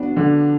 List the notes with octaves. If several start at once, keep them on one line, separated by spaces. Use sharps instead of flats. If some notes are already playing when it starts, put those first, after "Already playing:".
Already playing: B3 D4 F#4
D3